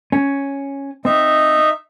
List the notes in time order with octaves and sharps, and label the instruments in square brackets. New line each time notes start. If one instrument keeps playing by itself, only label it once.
[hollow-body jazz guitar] C#4
[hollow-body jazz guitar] C4 [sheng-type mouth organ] D#4 E5